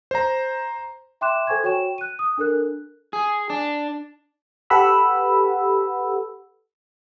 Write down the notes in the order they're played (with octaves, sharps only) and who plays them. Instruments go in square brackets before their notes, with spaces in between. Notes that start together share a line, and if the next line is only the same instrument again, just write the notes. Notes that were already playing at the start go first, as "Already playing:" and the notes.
[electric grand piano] C5 A#5
[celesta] E5 G5 C6 D6 F#6 E7
A4 C5 G#5 C#6 G#6
F#4 C#5 G5 C#6 E7
F#6 D#7
D#6
D4 A4 A#4 F#6
[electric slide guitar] G#4
D4
[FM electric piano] G4 A4 B4 F#5 B5 E6